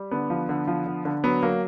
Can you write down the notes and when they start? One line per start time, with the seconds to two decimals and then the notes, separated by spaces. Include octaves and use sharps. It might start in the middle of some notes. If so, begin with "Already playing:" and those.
Already playing: G3
0.11 D3 B3
0.30 F3
0.49 D3
0.67 F3
0.86 D3
1.05 D3
1.24 F#3 B3
1.43 F#3 A#3